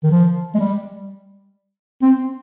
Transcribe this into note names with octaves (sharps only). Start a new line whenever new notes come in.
D#3
F3
G#3
G3
C4